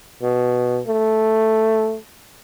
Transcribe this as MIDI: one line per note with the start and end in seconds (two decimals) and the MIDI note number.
0.23 0.81 47
0.87 1.97 57